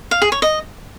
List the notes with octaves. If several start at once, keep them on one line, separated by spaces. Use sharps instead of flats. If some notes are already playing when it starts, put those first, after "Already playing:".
F5
G#4
C#5
D#5